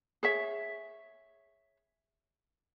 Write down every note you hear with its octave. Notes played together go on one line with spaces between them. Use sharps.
G#4 C#5 E5